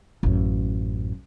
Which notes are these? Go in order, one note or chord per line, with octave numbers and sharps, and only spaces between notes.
A1 F#2